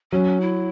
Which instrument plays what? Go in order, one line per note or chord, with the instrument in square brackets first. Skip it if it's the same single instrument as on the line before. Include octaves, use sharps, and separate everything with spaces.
[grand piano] F#3 [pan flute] C#4
[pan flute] E4